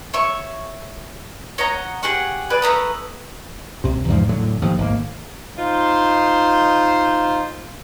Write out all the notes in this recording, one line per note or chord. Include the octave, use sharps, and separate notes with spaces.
C#5 E5 C#6
C#5 D#5 F#5 A#5
G4 G#4 F#5 C#6
G#4 B4 D5
A3 B4 A#5 D#6
C2 C3
E2 G#2 F3
A2 D3 F#3
D#2 F3
G#1 A#3
D#4 F4 C5